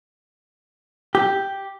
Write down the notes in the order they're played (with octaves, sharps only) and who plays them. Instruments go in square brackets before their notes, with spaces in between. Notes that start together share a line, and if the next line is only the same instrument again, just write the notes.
[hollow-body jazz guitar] G4